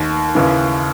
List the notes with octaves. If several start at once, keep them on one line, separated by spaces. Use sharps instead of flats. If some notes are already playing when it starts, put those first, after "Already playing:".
Already playing: D#2 D#3
D#2 C#3 E3